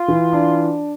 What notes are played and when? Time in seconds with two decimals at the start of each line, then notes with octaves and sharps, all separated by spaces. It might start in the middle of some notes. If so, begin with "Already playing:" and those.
Already playing: F4
0.08 E3
0.33 D4